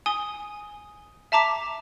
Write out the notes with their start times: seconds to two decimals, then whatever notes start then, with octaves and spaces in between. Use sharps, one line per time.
0.06 G#5 D#6 G7
1.32 E5 A5 A#5 D6 B6